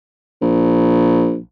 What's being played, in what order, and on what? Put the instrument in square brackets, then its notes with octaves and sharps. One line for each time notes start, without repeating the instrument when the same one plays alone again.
[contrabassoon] A#1